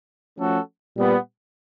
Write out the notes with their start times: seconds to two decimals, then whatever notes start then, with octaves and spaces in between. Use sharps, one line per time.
0.38 F3 A3 C#4 F#4 A4
0.96 A#2 G3 B3